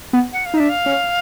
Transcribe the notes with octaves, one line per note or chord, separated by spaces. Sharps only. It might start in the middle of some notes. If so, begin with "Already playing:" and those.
B3
F#5
F5
D#4
D4 E5
F5
C#4